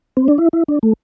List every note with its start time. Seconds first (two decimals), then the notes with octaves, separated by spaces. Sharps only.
0.17 C4
0.28 D4
0.38 E4
0.53 E4
0.68 D4
0.83 A3